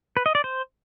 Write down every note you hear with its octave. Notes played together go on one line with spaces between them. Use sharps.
B4
D#5
D5
C5